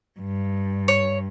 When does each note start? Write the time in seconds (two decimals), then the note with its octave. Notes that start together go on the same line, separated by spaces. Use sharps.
0.20 G2
0.88 C#5